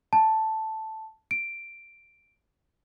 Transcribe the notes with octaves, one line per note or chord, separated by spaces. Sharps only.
A5
D7